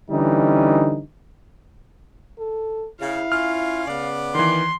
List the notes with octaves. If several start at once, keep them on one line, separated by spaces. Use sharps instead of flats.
D3 E3 G3 C#4 D#4
A4
C#3 E4 F5
C#4 F4 F6
C#3 B3 D5
D#3 E3 C6